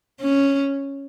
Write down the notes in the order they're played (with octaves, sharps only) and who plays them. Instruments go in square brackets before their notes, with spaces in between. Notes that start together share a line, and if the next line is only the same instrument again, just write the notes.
[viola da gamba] C#4